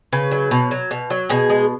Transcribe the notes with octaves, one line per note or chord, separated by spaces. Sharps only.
C#3 B4
F#3
B2
F#3
B2
F#3
B2 G#4
G#3